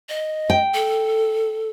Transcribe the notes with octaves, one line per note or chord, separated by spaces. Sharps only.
D#5
G5
A4